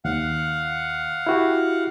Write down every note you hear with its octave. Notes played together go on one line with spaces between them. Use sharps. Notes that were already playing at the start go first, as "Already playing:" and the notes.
D#2 F5 F#5
E4 F#4 G4